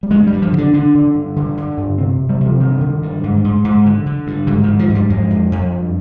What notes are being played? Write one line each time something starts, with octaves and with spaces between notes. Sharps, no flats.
G3
G2 G#3
G3
G2
F3
D3
D4
D3 D4
D3
G2
D3
D3
G2
C3 C4
C3
G3
C3
F3
G2 D#3
D3
G2
G#2
G#2
G#2
D3
D3
G2
G#2 D3
D#3
G#2
F3
G#2
G3
F2 G#3
F2
F2
G2